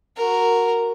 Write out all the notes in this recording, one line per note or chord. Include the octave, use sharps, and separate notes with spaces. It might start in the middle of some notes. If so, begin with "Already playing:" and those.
F#4 A#4